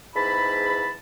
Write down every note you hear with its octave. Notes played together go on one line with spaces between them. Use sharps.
E2 G#2 A5 B5